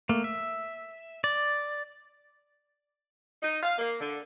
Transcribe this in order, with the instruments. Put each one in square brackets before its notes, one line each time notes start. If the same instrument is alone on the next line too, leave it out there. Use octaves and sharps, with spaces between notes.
[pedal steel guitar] A3 A#3
E5
D5
[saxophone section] D#4
F5
A#3
D3